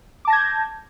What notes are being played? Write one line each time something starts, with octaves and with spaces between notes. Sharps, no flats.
A5 D6 G6 G#6 A#6